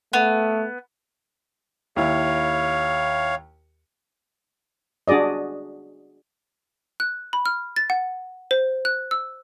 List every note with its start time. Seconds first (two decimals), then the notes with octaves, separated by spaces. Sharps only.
0.13 A3 B3
1.96 D#2 E4 C#5 F5
5.08 D4 F#4 G#4 D5 D#5
7.00 F#6
7.33 B5
7.46 F6
7.76 A6
7.90 F#5
8.51 C5
8.85 F#6
9.11 E6